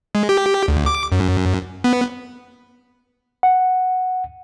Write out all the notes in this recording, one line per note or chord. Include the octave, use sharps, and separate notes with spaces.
G#3
G4
D2
D6
F#2
B3
F#5